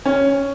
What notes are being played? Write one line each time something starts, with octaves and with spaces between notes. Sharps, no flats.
C#4